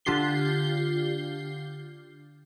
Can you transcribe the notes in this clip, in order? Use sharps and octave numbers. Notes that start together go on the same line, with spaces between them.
D3 D4 F4 G4 C7 G7